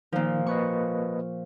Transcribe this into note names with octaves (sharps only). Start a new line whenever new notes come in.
A#2 D#3 F3
A#3 B4 D#5 C#6